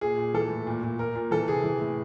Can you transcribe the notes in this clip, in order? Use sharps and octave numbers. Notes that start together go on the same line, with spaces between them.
A#2 G#4
A#2
E3 A4
A2
A#2
A#2
A#2 A#4
A#2
E3 A4
C3 G#4
E3
A2